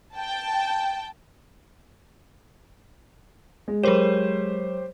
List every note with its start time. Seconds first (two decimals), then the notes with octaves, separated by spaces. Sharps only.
0.15 G5 A5
3.68 G#3
3.84 F#3 G4 A#4 C5 C#5 E7